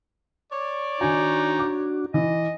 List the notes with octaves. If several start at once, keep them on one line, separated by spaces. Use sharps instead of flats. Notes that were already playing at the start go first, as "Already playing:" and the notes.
C#5 D5
D#3 D4 D#4 F#4 G#5
D6
E3 D#5